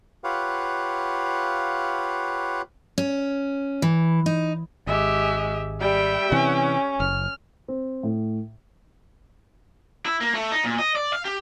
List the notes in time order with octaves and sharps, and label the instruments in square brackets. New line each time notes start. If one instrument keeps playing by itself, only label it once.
[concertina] F4 G4 B4 C#5 F5 F#5
[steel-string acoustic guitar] C#4
E3
D#4
[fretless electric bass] G#1 [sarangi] G#3 [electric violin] G4 E5
[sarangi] G3 [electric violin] E5 G5
[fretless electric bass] C3 E3 [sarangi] C#4
[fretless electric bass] F#1 [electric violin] F6
[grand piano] C4
A2
[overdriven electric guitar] E4
A#3
A3
D#4
A#2
D#5
D5
F5
G4